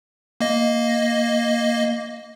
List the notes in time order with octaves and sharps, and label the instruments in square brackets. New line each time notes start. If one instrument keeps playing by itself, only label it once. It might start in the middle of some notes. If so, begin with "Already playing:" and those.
[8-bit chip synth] A#3 D#5